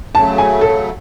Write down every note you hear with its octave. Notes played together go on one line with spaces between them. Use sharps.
C#3 F#3 A3 A5
G#5
A4